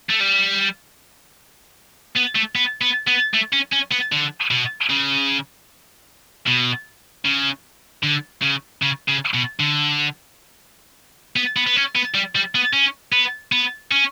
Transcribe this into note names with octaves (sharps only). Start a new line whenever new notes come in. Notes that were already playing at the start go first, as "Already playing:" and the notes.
A3
G3
B3
A3
B3
B3
B3
A3
C#4
C#4
B3
D3
B2
C#3
B2
C#3
D3
C#3
C#3
C#3
B2
D3
B3
B3
B3
C#4
B3
G3
G3
B3
C#4
B3
B3
C#4